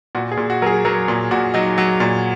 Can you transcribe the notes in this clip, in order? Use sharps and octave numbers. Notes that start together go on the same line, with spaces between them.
A#2 F#4
G#4
A#2
F#4
F#3 G#4 A#4
F#3 A#4
A#2
A#2 F#4
F#3 D#4
F#3
A#2